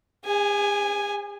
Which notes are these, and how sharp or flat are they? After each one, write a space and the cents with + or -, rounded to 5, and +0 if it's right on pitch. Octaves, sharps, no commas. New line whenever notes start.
G#4 -45 G#5 +0